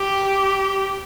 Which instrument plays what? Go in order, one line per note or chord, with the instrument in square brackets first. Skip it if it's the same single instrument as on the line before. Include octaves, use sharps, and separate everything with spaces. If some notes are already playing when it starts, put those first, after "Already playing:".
Already playing: [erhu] G4